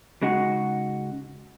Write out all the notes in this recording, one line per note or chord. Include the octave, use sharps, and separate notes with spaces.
C#3 G#3 D#4 F#4